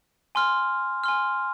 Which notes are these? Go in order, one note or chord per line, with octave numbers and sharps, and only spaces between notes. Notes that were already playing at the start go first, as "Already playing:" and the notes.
G#5 C6 F6
G#5 C6 F6